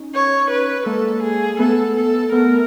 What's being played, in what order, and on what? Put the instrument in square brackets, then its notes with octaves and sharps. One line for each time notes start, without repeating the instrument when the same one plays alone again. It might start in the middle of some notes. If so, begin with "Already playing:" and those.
Already playing: [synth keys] C#4 D#4
[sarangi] C#5
B4
[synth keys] G#3 A#3 [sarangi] A4
[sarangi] G#4
[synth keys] A3 B3 [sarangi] A4
[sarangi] A4
[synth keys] A3 B3 [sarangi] A#4